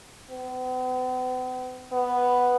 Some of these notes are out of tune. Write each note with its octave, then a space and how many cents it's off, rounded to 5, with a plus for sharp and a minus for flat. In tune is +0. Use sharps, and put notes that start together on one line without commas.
B3 +45
B3 +0